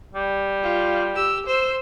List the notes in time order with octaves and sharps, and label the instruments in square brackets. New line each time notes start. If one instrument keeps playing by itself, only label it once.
[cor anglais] G3
[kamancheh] F4
G4 E6
C5 E6